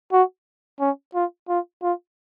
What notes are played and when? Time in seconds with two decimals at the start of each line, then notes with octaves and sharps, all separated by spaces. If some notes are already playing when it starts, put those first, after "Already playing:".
0.13 F#4
0.80 C#4
1.14 F4
1.49 F4
1.82 F4